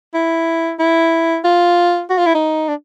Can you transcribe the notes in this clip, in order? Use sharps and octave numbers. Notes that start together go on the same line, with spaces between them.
E4
E4
F4
F#4
F4
E4
D#4
D4